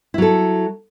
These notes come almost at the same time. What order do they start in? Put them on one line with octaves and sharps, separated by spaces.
E4 F#3 A4